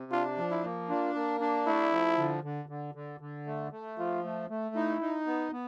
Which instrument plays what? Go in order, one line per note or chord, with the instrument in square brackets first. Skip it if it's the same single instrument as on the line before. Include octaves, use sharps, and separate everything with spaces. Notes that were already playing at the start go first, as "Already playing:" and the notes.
Already playing: [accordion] C3
[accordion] D4 [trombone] F4
[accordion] F3
[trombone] E4
[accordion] A#3
[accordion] D4 [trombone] F4
[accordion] A#3
D4
[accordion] A3 [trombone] E4
[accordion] F3
D3
D3
D3
D3
D3
A3
A3
[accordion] F3 [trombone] F4
[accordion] A3
A3
[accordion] D#4 [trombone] E4
[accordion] D#4
B3
B3